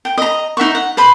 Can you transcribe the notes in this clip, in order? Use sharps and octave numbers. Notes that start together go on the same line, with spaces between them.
G5
D#5 A#5
D#4 E5 F#5 C#6
F#5
B4 C5 B5 C6